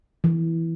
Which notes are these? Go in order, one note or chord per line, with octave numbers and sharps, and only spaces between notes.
E3